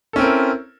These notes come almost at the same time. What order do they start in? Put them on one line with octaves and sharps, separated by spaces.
A4 C#4 C4 A#4 E4